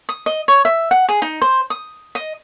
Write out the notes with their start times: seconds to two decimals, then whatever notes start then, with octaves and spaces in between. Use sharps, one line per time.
0.09 D#6
0.26 D#5
0.48 C#5
0.65 E5
0.91 F#5
1.09 G#4
1.22 D#4
1.42 C5
1.70 D#6
2.15 D#5